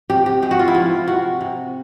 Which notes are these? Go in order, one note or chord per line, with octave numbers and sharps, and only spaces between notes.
C3 G4
G4
G#3 G4
F#4
F4
E4
F3 F4
C3 F#4
C3